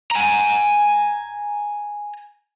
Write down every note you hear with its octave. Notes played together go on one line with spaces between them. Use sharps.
G#5 A#5